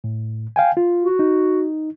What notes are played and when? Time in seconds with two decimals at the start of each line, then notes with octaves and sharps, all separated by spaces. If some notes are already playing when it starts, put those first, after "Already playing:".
0.04 A2
0.56 F5 G5 G#5
0.77 F4
1.03 F#4
1.19 D#4